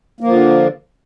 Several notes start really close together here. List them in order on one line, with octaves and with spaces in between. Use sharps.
A#3 F3 D3